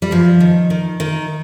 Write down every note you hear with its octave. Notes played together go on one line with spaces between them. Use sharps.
G3
G2 F3
D#3
D#3
D#3